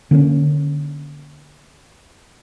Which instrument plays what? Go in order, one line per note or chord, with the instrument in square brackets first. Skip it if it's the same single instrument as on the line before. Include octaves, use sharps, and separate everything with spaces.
[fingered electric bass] D3 A#3 C4 C#4